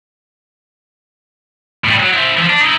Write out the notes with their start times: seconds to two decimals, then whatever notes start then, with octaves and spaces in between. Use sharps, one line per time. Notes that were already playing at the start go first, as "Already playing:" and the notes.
1.84 A2 G3
2.00 F#3
2.13 E4 C5
2.37 E3 F3
2.50 D4
2.62 D#4 E4